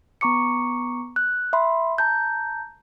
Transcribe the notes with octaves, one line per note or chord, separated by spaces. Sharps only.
B3 A#5 C#6 D6 C#7
F#6
E5 B5 C6
A5 A#5 G6